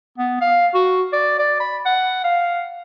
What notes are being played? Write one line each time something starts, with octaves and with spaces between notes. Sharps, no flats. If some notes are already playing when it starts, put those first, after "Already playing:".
B3
F5
F#4
D5
D5
B5
F#5
F5